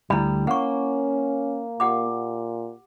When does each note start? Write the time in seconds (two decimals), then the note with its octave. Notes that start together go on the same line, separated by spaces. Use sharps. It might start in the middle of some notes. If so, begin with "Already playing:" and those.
0.10 D2 G3 E4 B5
0.47 A#3 C#4 F#5 C#6
1.80 A#2 G4 F#5 D6